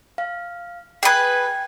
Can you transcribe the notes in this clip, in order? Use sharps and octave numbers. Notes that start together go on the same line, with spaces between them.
F5
G#4 B4 G5 G#6